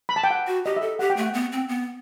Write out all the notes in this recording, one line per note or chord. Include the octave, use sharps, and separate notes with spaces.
B5
A5
G5
F#5
F#4
G4 D#5
E5
A4
G4 F#5
G5
A3 F#5
B3
C4
B3